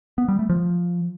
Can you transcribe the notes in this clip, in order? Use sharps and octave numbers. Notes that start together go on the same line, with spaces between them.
B3
G3
A3
F3